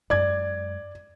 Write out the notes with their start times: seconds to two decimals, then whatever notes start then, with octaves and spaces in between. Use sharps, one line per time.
0.10 F#2 G#3 D5 G#6